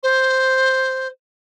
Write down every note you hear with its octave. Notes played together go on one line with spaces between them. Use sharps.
C5